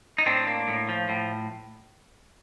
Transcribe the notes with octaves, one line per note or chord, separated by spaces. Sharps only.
D#4
A2 C4 D4
A#3
A2
F3
A2